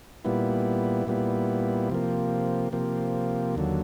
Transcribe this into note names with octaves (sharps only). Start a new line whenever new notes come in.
A#2 G3 B3 E4
A#2 G3 B3 E4
C3 F3 A#3
C3 F3 A#3
D#2 D3 F#3